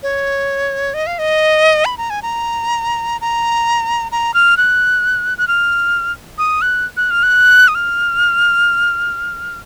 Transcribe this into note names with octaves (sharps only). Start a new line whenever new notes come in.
C#5
D#5
F5
D#5
B5
A#5
G#5
A#5
A#5
A#5
F6
F#6
F#6
F6
D#6
F#6
F#6
F6
F#6
D#6
F6